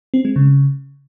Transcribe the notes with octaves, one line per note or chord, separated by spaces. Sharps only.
C4
G#3
C#3